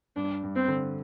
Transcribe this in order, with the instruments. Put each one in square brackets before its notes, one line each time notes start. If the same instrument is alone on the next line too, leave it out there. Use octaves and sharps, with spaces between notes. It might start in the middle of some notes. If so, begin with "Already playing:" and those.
[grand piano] G2 [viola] D4
[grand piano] G2
[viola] C4
[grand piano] D3